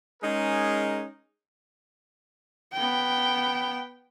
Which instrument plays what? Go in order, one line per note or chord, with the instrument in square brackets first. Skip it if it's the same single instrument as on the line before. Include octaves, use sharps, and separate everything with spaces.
[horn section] G#3 C#4 D#4 G#4 A#4
[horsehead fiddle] B3 G5